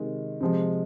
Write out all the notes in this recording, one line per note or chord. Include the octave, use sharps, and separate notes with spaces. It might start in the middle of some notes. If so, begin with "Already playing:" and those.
Already playing: C3 D#3 G#3
C3 F3 G#3